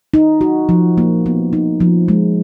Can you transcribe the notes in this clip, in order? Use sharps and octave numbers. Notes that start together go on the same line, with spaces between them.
D#4
F#4
F3
A#3
B3
D#4
F3
G#3